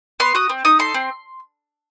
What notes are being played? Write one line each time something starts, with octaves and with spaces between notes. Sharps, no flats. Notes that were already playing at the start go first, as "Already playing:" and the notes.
B3 C6
F#4 D#6
C4
D#4 D#6
A4 C6
C4